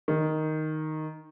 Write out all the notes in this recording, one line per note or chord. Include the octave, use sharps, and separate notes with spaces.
D#3